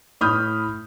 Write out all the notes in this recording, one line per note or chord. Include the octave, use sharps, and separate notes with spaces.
A2 B5 D#6 F6 G6